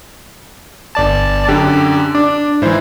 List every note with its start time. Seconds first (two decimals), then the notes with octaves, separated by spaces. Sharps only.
0.95 G1 D5 A5
1.49 F#2 D3 G4
2.15 D4 D6
2.62 G#2 E3 E4 C5